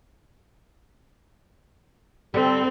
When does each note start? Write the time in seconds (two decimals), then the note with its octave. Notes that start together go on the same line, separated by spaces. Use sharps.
2.34 D3 G3 C4 A4